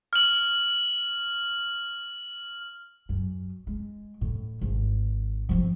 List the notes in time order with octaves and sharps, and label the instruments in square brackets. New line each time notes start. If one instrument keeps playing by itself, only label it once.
[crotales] F6 F#7
[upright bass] F#2
G#3
A2
G#1
F3 C4